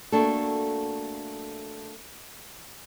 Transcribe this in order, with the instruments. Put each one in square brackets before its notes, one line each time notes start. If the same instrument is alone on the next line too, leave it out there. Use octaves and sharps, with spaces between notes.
[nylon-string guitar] A3 A#3 D4 F#4 A4